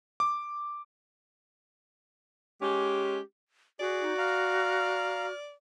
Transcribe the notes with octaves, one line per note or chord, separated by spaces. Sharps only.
D6
G#3 C#4 G4
F#4 G#4 D5
D#4
F5 A#5 F6